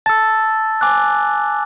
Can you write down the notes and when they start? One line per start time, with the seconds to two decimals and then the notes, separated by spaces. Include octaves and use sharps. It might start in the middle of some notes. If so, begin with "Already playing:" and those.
0.06 A5 E6 A6
0.81 G#5 D6 F#6